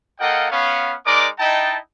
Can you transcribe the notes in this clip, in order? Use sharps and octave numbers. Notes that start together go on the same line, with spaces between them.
A#3 F4 A4 D#5 F#5 G5
B3 C#4 F5
G#3 D#4 A#4 D5 D6
D#4 E4 D#5 G5 A5